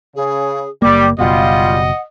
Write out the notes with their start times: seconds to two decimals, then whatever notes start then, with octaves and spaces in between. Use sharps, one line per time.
0.15 C#3 G#4
0.82 F#1 G3 A#3 D6
1.19 F#1 B2 G3 F4 D#5 F#5